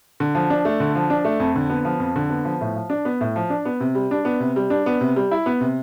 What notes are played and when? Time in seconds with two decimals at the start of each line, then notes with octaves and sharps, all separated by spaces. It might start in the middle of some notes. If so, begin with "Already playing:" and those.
0.20 D3
0.35 F3
0.50 D4
0.65 A3
0.80 D3
0.95 F3
1.10 D4
1.25 A3
1.40 F2
1.56 D3
1.70 B3
1.85 F3
2.00 F2
2.16 D3
2.30 B3
2.45 F3
2.61 A2
2.76 F3
2.90 D4
3.05 B3
3.21 A2
3.36 F3
3.50 D4
3.65 B3
3.80 C3
3.95 G3
4.11 D4
4.25 B3
4.40 C3
4.56 G3
4.70 D4
4.86 B3
5.01 C3
5.16 G3
5.31 E4
5.46 B3
5.61 C3